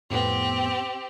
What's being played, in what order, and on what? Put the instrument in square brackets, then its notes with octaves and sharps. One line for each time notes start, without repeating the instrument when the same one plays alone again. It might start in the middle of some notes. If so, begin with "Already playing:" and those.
[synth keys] F2 A2 B3 [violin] C4 G4